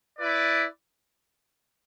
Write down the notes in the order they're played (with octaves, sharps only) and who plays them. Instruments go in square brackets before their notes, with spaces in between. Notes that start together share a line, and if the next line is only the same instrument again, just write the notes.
[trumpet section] E4 B4 D5